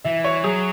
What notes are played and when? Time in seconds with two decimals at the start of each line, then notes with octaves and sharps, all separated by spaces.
0.04 E3 E5
0.24 C#5
0.43 F#3 G#4